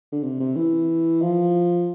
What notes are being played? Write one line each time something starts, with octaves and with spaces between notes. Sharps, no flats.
D3
C3
C3
E3
F3